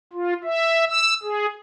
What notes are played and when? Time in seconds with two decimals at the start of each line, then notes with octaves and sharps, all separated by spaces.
0.13 F4
0.44 E5
0.89 E6
1.23 G#4